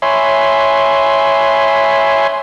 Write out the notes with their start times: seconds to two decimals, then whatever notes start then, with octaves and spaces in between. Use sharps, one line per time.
0.02 C#5 E5 G#5 B5 C6